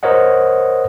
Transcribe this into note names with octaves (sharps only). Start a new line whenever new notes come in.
A#4 C5 C#5 D#5 F#5